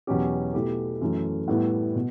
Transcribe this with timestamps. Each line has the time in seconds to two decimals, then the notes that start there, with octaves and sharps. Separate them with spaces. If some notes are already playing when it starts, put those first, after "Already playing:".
0.07 E2 B2 F#3 C#4 G4
0.54 B2 A3 E4 G4
1.01 F#2 E3 A3
1.48 A2 G3 B3 E4
1.95 B2